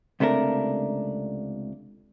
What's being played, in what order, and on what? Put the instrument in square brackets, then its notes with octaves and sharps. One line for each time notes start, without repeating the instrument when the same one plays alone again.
[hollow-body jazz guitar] C#2 C3 A3 D4 A#4